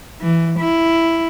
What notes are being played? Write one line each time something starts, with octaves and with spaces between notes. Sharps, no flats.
E3
E4